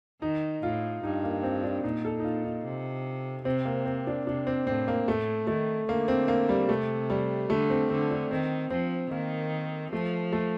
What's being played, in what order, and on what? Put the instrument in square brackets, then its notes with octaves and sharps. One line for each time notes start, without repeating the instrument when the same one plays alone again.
[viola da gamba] D#3 [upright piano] D#4
[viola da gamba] A2 [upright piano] F4
[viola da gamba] G2 [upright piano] D#4
[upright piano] A#3
C4
D4
[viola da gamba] A#2 [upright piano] D#4
[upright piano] A4
D#4
F4
D#4
[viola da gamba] C3
[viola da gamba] C3 [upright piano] C4
[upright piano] A#3
C4
D4
[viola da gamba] C3 [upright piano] D4
[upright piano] C4
[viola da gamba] A2 [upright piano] C4
[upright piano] A#3
[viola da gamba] A2 [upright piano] A3
[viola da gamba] D#3 [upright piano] A3
[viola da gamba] D3 [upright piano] A#3
[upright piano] C4
A#3
G3
[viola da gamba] C3 [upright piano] A3
[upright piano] G3
[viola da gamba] D3 [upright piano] A3
[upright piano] C4
[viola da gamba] D3 [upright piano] C4
[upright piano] D4
[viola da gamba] D#3 [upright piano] C4
[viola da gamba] F3 [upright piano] C4
[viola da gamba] D#3 [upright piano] A#3
[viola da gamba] F3 [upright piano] A3
[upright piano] A3